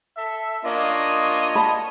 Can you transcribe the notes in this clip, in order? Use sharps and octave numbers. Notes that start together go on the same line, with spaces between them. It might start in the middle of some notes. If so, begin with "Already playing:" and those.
A4 E5
A#3 D4 F4 C#5 D#5
F#5 A5 B5